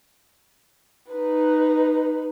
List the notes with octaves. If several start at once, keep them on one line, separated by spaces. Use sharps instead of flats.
D#4 B4